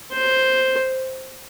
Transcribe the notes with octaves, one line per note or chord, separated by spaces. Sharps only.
C5